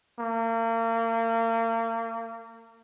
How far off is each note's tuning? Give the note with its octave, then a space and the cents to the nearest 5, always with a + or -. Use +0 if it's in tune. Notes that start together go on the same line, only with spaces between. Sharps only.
A#3 -35